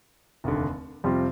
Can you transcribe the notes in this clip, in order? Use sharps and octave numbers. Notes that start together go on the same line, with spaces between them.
F1 D#2 D3
F2 C3 G3 C4 F4